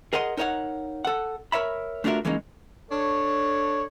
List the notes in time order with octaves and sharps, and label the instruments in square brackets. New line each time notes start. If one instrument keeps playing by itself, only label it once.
[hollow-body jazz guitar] G#4 A#4 D#5 F#5 C6
D#4 A#4 C#5 F5 F#5
A4 F#5
A#4 C#5 E5 B5
A3 D4 F4 F#4 A#4 E5
E3 G#3 A#3 C#4 D#4
[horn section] D4 A4 C#5